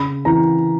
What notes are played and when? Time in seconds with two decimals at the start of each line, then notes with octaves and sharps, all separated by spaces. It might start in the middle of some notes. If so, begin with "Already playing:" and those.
Already playing: C#3 B5
0.25 E3 A#5